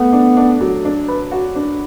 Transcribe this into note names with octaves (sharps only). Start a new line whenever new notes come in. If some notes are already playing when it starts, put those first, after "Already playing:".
Already playing: A3 B3
D4
D4
F#3
D4
B4
F#4
D4